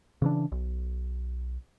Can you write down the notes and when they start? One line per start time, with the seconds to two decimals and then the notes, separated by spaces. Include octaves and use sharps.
0.22 C#3 E3 D4
0.52 B1